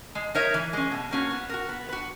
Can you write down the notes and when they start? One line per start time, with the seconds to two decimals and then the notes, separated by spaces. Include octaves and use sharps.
0.15 G#3
0.35 D#4 A#4 C#5 E5
0.54 E3
0.73 G#3 C#4
0.91 B2
1.11 A#3 C#4 F#4
1.31 B3
1.49 F#4 A#4
1.69 B3
1.89 F#4 B4